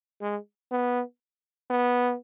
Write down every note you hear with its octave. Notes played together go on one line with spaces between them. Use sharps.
G#3
B3
B3